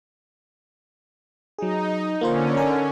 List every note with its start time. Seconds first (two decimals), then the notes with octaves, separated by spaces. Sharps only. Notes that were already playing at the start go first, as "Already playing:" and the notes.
1.58 F#3 D#4 G#4
2.21 D3 A#3 C#4 F4 C5
2.57 A#4 G#5